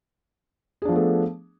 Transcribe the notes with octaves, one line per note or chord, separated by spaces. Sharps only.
F3 A3 B3 D4 G#4